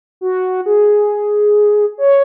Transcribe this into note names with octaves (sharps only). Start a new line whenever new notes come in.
F#4
G#4
C#5